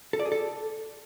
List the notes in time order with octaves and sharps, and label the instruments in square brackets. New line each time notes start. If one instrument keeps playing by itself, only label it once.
[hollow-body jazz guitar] A4
D5
G#4
A4